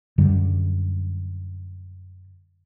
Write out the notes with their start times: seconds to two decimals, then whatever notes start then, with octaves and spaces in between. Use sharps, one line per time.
0.18 F#2 D3 G3